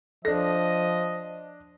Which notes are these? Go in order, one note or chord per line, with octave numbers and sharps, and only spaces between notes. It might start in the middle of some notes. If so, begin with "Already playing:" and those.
F3 D4 A4 D#5 A#6